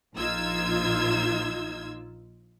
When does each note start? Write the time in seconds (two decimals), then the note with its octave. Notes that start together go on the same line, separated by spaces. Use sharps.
0.15 A#1 F3 D#4 F4 E6 G#6